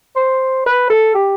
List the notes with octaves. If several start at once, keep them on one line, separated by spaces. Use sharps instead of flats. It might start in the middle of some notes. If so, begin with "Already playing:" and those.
C5
B4
A4
G4